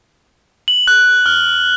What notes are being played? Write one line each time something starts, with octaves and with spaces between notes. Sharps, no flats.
F#7
F#6
F6